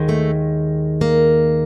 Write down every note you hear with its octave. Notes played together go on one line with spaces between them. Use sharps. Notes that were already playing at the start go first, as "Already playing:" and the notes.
Already playing: D#2 D#3 G#3
A3
A#3